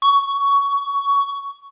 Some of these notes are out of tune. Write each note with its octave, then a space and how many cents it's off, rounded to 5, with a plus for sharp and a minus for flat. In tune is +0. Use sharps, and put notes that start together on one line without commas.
C#6 +15